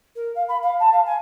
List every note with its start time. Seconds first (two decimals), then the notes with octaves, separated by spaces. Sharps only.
0.16 A#4
0.35 F5
0.49 B5
0.63 F5
0.80 A5
0.93 F5
1.06 G#5